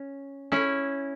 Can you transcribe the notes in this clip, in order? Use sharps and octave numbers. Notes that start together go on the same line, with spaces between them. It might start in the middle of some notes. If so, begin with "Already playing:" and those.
Already playing: C#4
C#4 E4